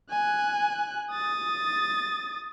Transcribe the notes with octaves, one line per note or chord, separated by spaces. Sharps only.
G#5 F#6
D#6 A6